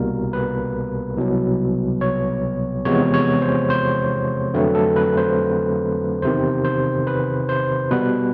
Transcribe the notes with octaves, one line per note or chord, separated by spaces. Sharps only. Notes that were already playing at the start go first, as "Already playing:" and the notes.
Already playing: C2 B2 G3 A#3 A#4
B4
C2 B2 F#3
C#5
E2 C3 F3 G#3 B3 C#5
C#5
C5
C5
F2 D3 F#3 A3 C4 B4
A4
B4
C5
E2 C3 D#3 C5
C5
B4
C5
B2 G3 B3 B4